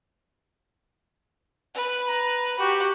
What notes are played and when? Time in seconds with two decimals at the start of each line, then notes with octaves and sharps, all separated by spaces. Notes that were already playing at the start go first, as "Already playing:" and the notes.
1.75 B4
2.08 A#5
2.59 F#4 G4